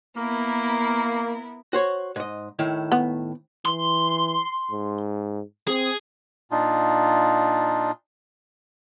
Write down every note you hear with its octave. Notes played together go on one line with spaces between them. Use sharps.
A#3 B3 E4 A#4
F#4 C5 C#5
G#2 D#5
A2 D#3 E4
B3
E3 C6
G#2
C4 G#4
A#2 D4 D#4 F4